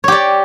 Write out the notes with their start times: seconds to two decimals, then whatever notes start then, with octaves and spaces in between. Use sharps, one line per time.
0.04 C#5
0.08 G4
0.12 D5